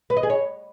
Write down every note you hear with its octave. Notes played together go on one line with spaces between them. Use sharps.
B4
D#5
G#4
C#5